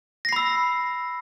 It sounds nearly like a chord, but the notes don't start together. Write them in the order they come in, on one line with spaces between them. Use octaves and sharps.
A#6 C7 B5 E6